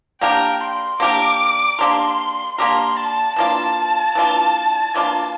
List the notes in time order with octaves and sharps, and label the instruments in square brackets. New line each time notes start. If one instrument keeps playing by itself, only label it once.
[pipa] A#3 D4 G4 A#4 [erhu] G5
[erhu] C6
[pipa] A#3 D4 G4 A#4 [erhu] D6
[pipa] A#3 D4 G4 A#4 [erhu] C6
[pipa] A#3 D4 G4 A#4 [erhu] C6
[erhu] A5
[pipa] E3 A#3 D4 F4 [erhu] A5
[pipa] E3 A#3 D4 F4
E3 A#3 D4 F4